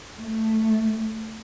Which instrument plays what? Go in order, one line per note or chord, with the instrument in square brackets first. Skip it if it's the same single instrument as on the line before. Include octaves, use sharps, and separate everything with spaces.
[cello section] A3